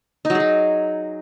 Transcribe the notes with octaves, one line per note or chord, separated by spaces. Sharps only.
D#4
F#3
G#4
F#3